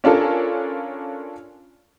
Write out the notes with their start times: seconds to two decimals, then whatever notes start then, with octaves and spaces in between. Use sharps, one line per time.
0.04 C#4 D4 F4 A4 A#4